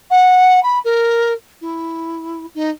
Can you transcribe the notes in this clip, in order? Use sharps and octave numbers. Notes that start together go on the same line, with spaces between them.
F#5
B5
A#4
E4
D#4